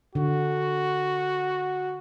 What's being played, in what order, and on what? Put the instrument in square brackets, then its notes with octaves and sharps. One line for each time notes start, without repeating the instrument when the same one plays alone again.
[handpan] D3 [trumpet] F#4